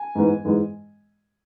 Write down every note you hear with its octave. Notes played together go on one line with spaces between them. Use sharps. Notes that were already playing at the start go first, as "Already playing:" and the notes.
Already playing: G#5
G#2 E3 G#3 B3
G#2 E3 G#3 B3